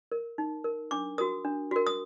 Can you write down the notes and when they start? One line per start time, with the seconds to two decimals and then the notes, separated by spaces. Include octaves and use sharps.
0.12 A#4
0.38 D#4
0.64 A#4
0.91 D4 D6
1.18 F#4 A#4 D#6
1.45 D4
1.71 F#4 A#4
1.87 D#6